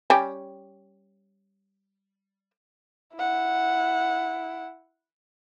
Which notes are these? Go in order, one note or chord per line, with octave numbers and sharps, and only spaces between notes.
G3 C#4 G4
E4 F#5